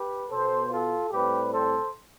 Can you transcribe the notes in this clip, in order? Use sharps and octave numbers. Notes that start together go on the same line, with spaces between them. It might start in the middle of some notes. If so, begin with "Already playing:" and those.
Already playing: G4 B4
B2 B3 A4 C5
F4 A4
A2 G3 C4 G4 B4
A4 C5